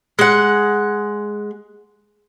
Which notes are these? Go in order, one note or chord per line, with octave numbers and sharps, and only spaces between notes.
G#3 F#5